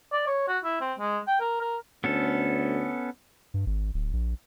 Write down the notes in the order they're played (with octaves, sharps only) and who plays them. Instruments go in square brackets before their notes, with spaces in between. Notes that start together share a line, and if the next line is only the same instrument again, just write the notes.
[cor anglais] D5
C#5
F#4
E4
C4
G#3
G5
A#4
A#4
[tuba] D2 [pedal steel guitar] B3 C#4 A4
[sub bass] G2
G#1
D1
A#1